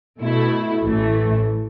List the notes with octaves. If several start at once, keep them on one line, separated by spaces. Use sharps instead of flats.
B2 A3 E4
A1 A2 E3 A3